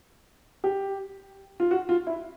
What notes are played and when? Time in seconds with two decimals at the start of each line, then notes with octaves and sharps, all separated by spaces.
0.64 G4
1.60 F4
1.71 F#4
1.89 F4
2.07 E4